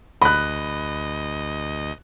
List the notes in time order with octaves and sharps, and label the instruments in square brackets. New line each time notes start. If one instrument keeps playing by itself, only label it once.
[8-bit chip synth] D2 D#5 [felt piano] B5 F#6